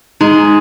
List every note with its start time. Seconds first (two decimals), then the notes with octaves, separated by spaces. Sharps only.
0.21 G#3 D#4